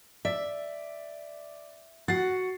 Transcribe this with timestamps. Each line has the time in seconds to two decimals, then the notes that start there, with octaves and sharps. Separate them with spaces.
0.25 D5 E5
2.08 F#4 F#5 A6 C7